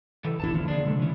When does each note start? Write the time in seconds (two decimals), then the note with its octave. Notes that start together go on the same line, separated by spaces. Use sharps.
0.25 E3 A4
0.40 E1 A1 D4 E4 A5
0.54 D3 E3 F3 A#3 F4
0.68 D4 G#4
0.83 C3 G#3 A3
0.99 E3 C#4